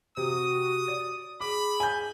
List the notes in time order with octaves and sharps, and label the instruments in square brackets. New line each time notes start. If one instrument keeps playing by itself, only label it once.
[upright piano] C3 [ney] F#4 [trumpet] D#6
[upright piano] D5
[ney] G#4 [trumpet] B5 [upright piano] D6
[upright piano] G#5 G6